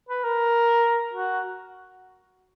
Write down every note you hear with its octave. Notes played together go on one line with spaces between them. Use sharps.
B4
A#4
F#4